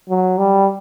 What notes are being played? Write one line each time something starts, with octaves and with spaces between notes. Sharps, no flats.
F#3
G3